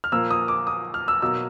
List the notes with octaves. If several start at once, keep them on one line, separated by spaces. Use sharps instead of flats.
F6
A#2 F3 A#3 E6
D#6
D6
D#6
F6
E6
B2 F#3 A#3 E6